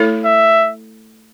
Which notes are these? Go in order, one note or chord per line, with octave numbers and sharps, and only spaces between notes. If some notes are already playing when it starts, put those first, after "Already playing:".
Already playing: A3 E4 A4 C#5
E5